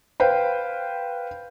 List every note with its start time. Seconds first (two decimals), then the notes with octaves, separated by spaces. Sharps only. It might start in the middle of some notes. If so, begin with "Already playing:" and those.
0.20 B4 C5 F5 G5